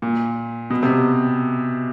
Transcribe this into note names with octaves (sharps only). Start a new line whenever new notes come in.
A#2
B2
C3